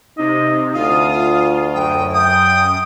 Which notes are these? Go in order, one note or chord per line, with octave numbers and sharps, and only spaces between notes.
C3 D#4 D#5
D2 F4 F5 D#6
F#2 G5 D#6
G5 D#6